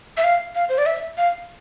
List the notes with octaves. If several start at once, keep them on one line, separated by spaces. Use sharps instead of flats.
E5
F5
F5
C5
D5
E5
F5